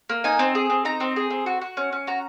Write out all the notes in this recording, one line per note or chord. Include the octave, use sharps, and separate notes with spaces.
A#3
D#4 G#5
C4
G#4
C4
D#4 A#5
C4
G#4
C4
F#4
F#4
C#4
C#4
F#4 A#5